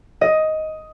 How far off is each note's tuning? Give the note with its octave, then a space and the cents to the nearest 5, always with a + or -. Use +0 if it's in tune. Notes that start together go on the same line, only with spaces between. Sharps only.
D#5 +10